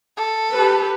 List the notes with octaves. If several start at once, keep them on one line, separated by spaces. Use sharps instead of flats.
A4
G4 B4